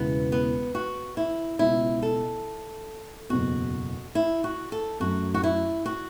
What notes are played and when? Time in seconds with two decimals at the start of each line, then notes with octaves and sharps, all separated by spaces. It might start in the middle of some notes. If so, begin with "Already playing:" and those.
Already playing: E1 E2 C#3 E3 B3
0.32 B3
0.75 F#4
1.17 E4
1.59 C#2 B2 B3 E4
2.02 A4
3.29 F#1 E2 B2 F#4
4.15 E4
4.44 F#4
4.72 A4
5.00 F#2 F#3 A3 F#4
5.34 F#4
5.44 E4
5.86 F#4